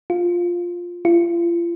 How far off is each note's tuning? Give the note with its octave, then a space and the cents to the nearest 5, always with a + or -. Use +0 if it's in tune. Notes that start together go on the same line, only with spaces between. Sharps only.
F4 +5
F4 -40